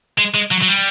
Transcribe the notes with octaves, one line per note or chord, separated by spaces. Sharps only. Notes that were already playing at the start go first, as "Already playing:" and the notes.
G#3
G#3
F#3
F#3
G3